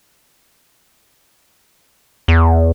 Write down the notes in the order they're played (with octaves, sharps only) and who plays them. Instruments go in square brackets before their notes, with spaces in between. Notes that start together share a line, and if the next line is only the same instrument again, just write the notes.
[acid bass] E2